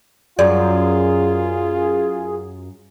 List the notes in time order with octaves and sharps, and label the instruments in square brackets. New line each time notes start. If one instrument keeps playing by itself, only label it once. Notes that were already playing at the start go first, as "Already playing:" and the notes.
[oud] F#2 [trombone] F4 [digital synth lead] G#4 [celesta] D5